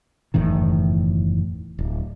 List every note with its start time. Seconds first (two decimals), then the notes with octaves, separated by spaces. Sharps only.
0.34 F#1 E2 A2 D#3
1.79 D1